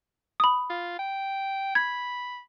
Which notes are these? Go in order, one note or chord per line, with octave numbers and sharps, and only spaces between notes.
B5 D#6
F4
G5
B5 G#6